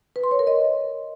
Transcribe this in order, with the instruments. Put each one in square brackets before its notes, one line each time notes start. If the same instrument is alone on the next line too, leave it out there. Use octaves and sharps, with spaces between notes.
[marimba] B4
C6
C#5
A#4
D#5